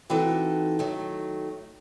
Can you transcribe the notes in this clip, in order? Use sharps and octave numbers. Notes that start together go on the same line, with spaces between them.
E3 C4 D#4 F#4 A4
D#3 F#3 A3